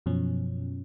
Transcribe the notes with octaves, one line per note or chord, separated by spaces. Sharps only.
F#2 B2 F3 C#4